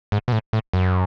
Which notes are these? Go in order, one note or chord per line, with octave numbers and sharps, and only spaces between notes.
G#2
B2
A2
A2
F#2